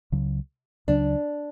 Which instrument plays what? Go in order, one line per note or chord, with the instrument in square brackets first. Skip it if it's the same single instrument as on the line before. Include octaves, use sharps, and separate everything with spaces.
[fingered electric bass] C#2 C#3 F#3
[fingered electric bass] C#2 C#3 F#3 [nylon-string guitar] D4